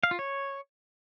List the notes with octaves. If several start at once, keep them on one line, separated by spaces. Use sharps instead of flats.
F5
F4
C#5